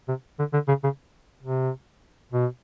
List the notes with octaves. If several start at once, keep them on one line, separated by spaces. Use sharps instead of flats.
C3
D3
D3
C#3
C#3
C3
B2